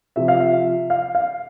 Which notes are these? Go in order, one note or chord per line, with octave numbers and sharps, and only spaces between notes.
C3 F3 E5
F5
E5
F5
F5